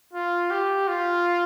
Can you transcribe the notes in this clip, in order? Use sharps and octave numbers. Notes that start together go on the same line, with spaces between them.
F4
G4
F4